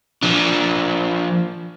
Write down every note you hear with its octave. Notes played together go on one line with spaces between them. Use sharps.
F3 D4